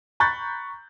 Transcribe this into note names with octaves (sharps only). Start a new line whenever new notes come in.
A#5 B5 C#6 F#6 G6 A6